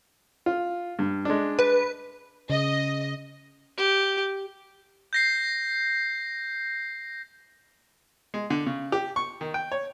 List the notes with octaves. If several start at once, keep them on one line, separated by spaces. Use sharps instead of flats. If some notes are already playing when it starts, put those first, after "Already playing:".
F4
G2
G#3 D4
B4
C#3 D#5
G4
G6 A#6 C7
G#3
D3
C#3
G4
C#6
D#3
G5
C#5